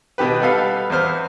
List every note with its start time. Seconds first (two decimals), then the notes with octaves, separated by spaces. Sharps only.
0.18 B2 D#3 G4 B4
0.40 G3 B3 A4 F5
0.90 E2 B3 C5 F6